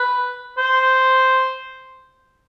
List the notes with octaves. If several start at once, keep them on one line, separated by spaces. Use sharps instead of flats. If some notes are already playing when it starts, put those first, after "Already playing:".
Already playing: B4
C5